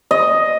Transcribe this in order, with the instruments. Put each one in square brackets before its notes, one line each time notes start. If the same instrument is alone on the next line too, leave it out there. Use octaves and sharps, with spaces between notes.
[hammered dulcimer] D#5